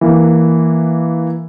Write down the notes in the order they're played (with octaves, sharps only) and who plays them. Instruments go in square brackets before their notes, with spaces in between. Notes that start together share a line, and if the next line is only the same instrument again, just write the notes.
[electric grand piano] E3 A#3